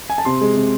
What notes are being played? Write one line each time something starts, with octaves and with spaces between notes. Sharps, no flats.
G#5
A5
C3 C6
G#3
C3